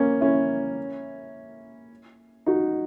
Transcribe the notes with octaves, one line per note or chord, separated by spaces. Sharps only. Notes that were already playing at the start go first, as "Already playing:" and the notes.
Already playing: A#3 C#4
C#4 E4
D#4 F#4